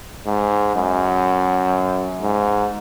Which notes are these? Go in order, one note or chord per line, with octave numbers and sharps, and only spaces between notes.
G#2
F#2
G#2